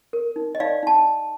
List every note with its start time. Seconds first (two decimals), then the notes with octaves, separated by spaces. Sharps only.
0.13 A#4
0.36 D#4
0.55 D#5
0.60 D#4 D5 F5
0.83 D#4 A5